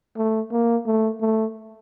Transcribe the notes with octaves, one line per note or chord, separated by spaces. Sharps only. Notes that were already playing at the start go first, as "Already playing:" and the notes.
A3
A#3
A3
A3